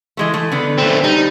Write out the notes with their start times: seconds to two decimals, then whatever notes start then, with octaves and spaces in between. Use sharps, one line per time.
0.17 E3 G#3 A3
0.34 A3
0.52 D3 B3
0.78 A3 C4
1.04 G3 D#4